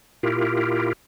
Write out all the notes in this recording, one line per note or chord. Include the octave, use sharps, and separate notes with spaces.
A#2 E4 F4 G4 A#4